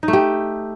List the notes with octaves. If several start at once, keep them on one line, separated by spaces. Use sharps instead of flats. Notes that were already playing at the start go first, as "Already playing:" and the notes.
D#4
A3
G4